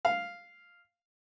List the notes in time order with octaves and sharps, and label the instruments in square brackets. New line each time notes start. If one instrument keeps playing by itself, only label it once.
[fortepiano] F5